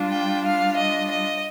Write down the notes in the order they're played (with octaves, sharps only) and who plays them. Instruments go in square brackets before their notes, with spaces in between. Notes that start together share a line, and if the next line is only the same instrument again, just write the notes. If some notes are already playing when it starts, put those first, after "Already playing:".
Already playing: [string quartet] G3 D4 F4
G5
F5
D#5
D#5